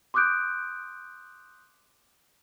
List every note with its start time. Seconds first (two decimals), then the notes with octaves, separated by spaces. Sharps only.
0.14 C6 D6 D#6 F#6 G6 D7